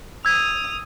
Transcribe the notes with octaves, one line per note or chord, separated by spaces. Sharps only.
D#6 E6 G#6 F7